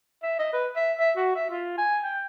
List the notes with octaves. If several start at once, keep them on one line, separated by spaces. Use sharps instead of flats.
E5
D#5
B4
E5
E5
F#4
E5
F4
G#5
G5